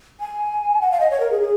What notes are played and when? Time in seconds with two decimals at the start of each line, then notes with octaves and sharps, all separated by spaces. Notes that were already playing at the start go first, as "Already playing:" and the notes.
0.20 G#5
0.81 F#5
0.91 F5
1.00 D#5
1.10 C#5
1.20 A#4
1.31 G#4
1.41 G#4